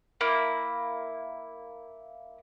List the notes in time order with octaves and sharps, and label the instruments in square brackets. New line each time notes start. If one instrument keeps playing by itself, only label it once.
[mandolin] A#3 E4